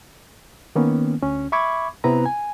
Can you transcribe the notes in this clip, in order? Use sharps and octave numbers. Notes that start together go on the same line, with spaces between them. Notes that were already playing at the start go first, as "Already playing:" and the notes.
D#3 A#3 B3 C#4
D2 C#4
E5 B5 C#6 D6 G#6
C3 B3 C4 E4 B4 A#5
G#5